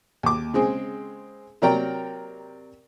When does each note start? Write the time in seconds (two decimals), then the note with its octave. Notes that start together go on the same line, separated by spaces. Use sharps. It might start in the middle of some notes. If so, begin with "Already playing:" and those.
0.23 D#2 D6
0.53 C#3 G#3 C4 G#4
1.62 C3 F#3 A#4 D5 G5 A#5